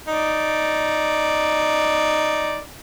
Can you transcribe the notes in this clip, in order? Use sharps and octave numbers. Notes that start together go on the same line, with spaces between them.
D#4 D5